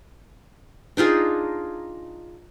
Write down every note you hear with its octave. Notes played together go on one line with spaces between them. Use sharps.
D4 D#4 F4 G#4